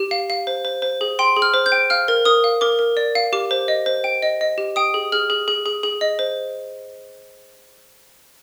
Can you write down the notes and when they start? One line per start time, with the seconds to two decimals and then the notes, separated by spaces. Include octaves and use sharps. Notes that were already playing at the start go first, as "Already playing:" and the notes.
Already playing: G4
0.11 F5
0.30 F5
0.47 C5
0.65 C5
0.82 C5
1.01 G#4
1.19 G5 C6
1.36 G#4
1.42 F6
1.54 C5
1.66 G6
1.72 G5
1.90 F5 F6
2.08 A#4
2.25 A#4 D#6
2.44 F5
2.61 A#4 D6
2.79 A#4
2.97 D5
3.15 F5
3.33 G4 D6
3.51 C5
3.68 D#5
3.86 C5
4.04 G5
4.22 D#5
4.41 D#5
4.58 G4
4.76 G5 D#6
4.94 G#4
5.12 G#4 F6
5.30 G#4
5.48 G#4
5.66 G#4
5.83 G#4
6.01 D#5
6.19 C5